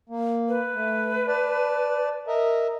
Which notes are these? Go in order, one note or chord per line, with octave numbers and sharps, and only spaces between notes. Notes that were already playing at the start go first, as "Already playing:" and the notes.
A#3
B4
A3
D5 A5
A#4 D#5 E5